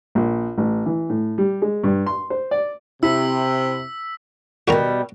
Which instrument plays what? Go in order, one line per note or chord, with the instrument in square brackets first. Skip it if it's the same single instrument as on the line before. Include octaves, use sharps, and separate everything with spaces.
[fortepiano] A#1
A1
E3
A2
G3
G#3
G2
C6
C5
D5
[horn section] C3 [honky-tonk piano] E4 [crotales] E6 B6
[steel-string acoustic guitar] B2 G3 [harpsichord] F#4 A#4 A#5